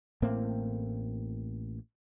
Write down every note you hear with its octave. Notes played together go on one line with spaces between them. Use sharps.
A1 A2 A#3 C4